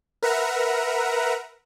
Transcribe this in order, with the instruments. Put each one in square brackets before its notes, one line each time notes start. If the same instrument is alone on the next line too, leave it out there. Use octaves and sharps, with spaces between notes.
[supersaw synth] A#4 B4 E5 F#5 A#5